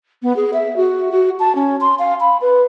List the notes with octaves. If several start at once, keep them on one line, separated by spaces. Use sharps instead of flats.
B3
G#4
E5
F#4
F#4
A5
C#4
C6
F5
B5
B4